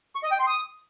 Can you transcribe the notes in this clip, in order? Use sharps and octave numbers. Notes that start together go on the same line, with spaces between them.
C#6
D#5
G5
C6
D#6